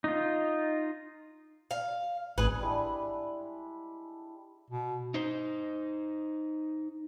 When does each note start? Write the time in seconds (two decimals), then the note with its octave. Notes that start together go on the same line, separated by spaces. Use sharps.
0.04 D#4 F4
1.71 F5
2.38 G#1 G#4 B4
2.60 G3 G#3 D4 E4
4.70 B2
5.14 D#4 C5